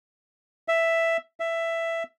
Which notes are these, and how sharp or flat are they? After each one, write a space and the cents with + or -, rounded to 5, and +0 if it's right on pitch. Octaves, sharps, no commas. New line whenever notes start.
E5 +5
E5 +10